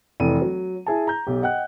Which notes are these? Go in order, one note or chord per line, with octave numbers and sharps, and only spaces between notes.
F1 E3 D#7
F#3
E4 G#4 G#5 A5
A#5 G6
B1 G4
D#5 F#5 G5 F#6